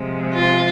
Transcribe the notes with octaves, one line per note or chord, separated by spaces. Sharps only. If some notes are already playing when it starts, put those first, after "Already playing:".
Already playing: C3 F3 G#3
F4